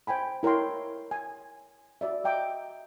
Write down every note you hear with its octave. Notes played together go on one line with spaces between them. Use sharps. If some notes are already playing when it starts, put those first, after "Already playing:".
C5 G5 G#5 B5
E4 A#4 C#5 G5 C6
G#5
F#4 D5 E5
D#5 E5 G5 A#5 D6